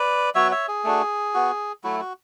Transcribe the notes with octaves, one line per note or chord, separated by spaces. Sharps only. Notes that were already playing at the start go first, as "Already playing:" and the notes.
Already playing: B4 D5
F#3 B3 F#4 C#5 E5
C#5 E5
G#4
A3 D4 F#4
B3 F#4
F#3 A3 E4 F#4
F#4